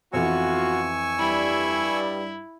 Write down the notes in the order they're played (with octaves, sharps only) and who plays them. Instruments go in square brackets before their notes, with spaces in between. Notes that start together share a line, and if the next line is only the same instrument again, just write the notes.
[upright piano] F2 E3 [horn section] B3 F4 F#4 [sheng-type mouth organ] G#5 C#6 E6
[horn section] G2 G3 [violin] E4